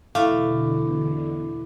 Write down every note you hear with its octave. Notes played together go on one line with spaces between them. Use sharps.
E2 B2 D3 A3 E4 F5 D6